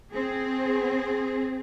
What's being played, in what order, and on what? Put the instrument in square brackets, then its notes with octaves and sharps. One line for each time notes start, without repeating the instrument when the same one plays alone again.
[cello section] C4 G#4